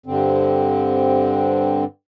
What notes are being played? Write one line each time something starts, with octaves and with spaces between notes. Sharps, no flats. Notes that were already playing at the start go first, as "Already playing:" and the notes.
G2 D3 C4